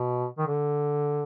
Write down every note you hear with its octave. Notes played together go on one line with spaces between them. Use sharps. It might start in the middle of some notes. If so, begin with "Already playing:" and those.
Already playing: B2
D#3
D3